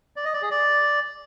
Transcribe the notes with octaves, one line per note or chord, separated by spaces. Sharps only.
D5
D#5
D5
G#4
D5